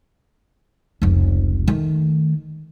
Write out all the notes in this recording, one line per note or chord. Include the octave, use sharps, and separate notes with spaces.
F1 C#2
D#3 A3